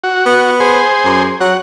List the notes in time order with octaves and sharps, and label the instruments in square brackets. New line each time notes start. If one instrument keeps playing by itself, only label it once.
[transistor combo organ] F#4
[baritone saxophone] B3
[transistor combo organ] G#4 C5
[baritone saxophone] F#2
[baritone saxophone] F#3 [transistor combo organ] F#5